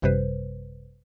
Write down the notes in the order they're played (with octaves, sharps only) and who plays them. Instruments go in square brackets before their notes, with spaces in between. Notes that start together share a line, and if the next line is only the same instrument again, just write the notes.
[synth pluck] G#1 F#2 C3 G3 B4 C5